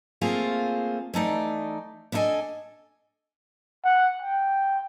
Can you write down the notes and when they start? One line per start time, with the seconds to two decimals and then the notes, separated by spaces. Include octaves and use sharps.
0.21 A3 A#3 C4 F4 G#4
1.14 E3 A3 D#4 D5
2.12 B3 D4 E4 A4 D#5 G#5
3.85 F#5
4.22 G5